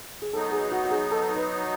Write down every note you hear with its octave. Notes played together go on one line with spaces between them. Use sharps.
G#4
F#3 B3 D#4 A4
G#4
F#4
F#4
G#4
A4
B4